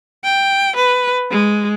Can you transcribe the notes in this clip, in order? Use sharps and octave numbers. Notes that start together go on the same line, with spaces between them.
G5
B4
G#3